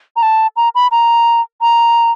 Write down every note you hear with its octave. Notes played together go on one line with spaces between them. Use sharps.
A#5
A5
A#5
B5
A#5
A#5